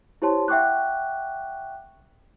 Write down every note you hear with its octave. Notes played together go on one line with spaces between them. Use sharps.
E4 G4 C5 C#5 A5 C6
E5 F#5 G5 C#6 D6 F#6